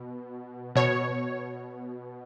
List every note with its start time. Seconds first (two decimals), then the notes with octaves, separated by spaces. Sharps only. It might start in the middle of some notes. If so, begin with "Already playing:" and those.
Already playing: B2
0.76 B2 C#5